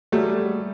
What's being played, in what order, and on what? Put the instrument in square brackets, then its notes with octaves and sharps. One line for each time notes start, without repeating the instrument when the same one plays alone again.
[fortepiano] F#3 A3 [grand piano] G3